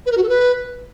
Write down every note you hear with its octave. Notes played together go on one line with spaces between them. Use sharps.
B4
A#4
F#4
A4
B4